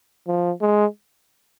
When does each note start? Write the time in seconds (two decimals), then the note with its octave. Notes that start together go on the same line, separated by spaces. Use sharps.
0.27 F3
0.61 G#3